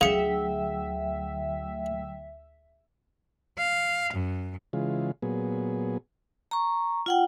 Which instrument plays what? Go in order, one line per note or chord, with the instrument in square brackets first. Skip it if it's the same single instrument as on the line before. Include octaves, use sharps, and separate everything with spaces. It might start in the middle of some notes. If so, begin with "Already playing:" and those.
[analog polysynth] D2 E5 [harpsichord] C#3 [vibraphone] F#3 G5 [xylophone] G#4 C#7
[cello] F5
F#2
[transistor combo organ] C#3 E3 G#3 F4
A#2 F#3 B3 G#4
[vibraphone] A#5 C#6
F4 F#5 G5